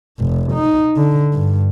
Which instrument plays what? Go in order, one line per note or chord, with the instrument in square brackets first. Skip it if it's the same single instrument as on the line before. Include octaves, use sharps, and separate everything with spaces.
[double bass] F1
D#4
D3
G2